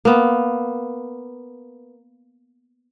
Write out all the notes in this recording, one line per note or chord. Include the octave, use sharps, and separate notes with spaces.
A#3 B3